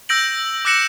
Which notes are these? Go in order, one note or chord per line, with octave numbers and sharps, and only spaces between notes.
E6 G6 A#6 D7 F#7
D6 E6 F#6 A#6 C#7 E7